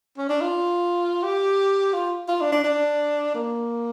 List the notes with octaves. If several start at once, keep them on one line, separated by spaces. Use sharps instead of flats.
C#4
D4
F4
G4
F4
F4
D4
D4
D4
A#3